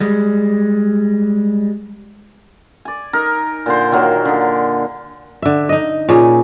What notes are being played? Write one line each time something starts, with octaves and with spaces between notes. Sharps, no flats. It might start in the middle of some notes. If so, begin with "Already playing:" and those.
G3 G#3
D5 G#5
D#4 A#4
A#2 D3 C5
D#3 F#3 A#3
D3 G#4
D3 E5
D#4 D#5
A#2 C#4 G#4